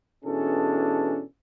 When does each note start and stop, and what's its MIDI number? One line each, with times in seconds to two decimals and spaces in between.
0.25 1.22 47
0.25 1.22 52
0.25 1.22 61
0.25 1.22 62
0.25 1.22 68
0.25 1.22 69